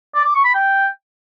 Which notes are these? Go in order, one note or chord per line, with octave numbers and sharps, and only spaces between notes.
D5
D6
C#6
B5
G5